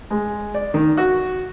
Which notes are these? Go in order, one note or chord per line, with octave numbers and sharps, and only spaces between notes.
G#3
D5
D#3
F#4